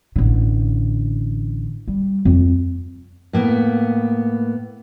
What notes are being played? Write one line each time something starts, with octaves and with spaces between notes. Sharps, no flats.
A1 D3
G3
F2
A2 A#3 B3